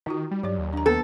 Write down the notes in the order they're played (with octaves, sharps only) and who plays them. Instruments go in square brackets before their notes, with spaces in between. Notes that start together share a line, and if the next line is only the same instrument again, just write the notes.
[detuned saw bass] D#3 [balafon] D#4 F4 F#4
[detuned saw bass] G3
[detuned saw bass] G2 [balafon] F#3 G4 D5
[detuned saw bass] D#2
[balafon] D4 A#5
[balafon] A#3 B3 B4 [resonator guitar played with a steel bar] A4